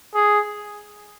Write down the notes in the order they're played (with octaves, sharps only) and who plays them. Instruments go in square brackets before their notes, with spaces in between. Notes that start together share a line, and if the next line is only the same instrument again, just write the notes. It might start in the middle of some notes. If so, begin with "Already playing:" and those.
[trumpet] G#4